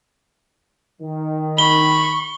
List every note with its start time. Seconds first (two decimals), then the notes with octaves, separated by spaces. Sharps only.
1.01 D#3
1.58 B5 C#6 G7